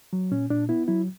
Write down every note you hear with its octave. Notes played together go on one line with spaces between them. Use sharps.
F#3
A#2 C#4
A#2 D4
B3 E4
F#3 E4